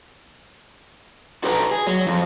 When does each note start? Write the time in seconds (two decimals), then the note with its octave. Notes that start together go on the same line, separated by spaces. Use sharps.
1.44 F#4 A4 B4 G5 G#5 A#5
1.71 G#4
1.86 F#3
2.07 F2